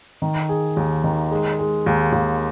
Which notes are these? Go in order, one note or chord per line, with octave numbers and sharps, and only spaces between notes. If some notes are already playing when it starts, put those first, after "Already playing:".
D#3
G#4
D#2
D#3
G#3
G#3
D#2
D#2